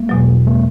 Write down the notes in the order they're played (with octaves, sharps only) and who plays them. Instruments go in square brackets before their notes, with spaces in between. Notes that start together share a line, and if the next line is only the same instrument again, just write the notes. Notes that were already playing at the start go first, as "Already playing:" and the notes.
Already playing: [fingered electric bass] G#3 A#3
[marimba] E2 B2 F#3
[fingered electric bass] G#3 A#3